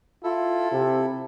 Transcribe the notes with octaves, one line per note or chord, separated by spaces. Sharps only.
E4 F4 A4
C3